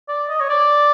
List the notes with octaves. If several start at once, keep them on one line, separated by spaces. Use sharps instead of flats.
D5
D#5
C#5
D5